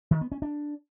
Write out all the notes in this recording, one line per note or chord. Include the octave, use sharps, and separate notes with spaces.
D#3
B3
C#4
D4